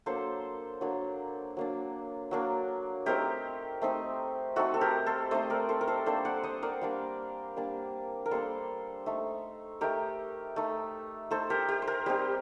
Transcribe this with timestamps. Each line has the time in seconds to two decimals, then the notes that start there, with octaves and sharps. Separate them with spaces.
0.06 F#3 A#3 D4 A4 C5
0.81 F#3 A#3 D4
1.57 F#3 A#3 D4
2.31 F#3 A#3 D4
3.06 A3 C4 D#4 G4 A#4
3.82 A3 C4 D#4
4.56 A3 C4 D#4 F#4 A4
4.74 A4
4.81 G4 A#4
5.06 A4 C5
5.31 A3 C4 D#4 C5 D#5
5.50 A#4 D5
5.69 A4 C5
5.81 A#4
5.88 A4 C5
6.06 G3 A#3 D4 A4 C5
6.25 D5 F#5
6.44 C5 D#5
6.62 A#4 D5
6.81 G3 A#3 D4
7.57 G3 A#3 D4
8.26 A#4
8.31 G3 A#3 D4 A4 C5
9.06 A3 D#4
9.81 A3 D#4 G4 A#4
10.56 A3 D#4
11.31 A3 D#4 A4 C5
11.50 G4 A#4
11.69 G4
11.82 C5
11.87 G4 A#4
12.06 G3 C4 D#4 G4